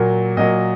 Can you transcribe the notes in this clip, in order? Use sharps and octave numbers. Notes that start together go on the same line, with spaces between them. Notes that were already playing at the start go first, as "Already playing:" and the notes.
Already playing: A#2 F#3 A#3
A#2 F#3 A#3 D#5